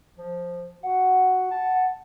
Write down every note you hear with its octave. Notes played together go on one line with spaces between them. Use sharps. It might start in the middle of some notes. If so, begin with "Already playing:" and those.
F3
F#4 F#5
A5